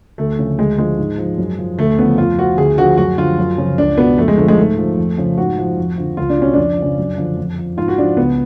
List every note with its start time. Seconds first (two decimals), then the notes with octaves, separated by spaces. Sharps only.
0.18 D2 A3
0.38 C#3 F3
0.58 D2 G#3
0.78 D3 F3 G#3
0.98 G#2
1.18 F3
1.38 F#2
1.59 F3
1.78 D2 A3
1.99 C#3 F3 B3
2.18 F2 F4
2.38 F3 F#4
2.57 D2 G#4
2.78 D3 F3 F#4
2.98 F#2 F#4
3.18 D3 F3 F4
3.39 F#2
3.58 C#3 F3
3.78 C#2 D4
3.98 B2 B3
4.18 F2 A3
4.28 G#3
4.38 D3 F3 A3
4.48 G#3
4.58 G#2 A3
4.77 F3
4.97 F2
5.18 C#3 F3
5.37 G#2 F#4
5.58 F3
5.77 F2
5.98 D3 F3
6.17 C#2 F4
6.29 D4
6.38 B2 C#4
6.54 F2 D4
6.78 C#3 F3
6.98 F#2
7.18 D3 F3
7.37 F2
7.58 F3
7.77 G#2 F4
7.88 F#4
7.98 F3 D4
8.17 C#2 B3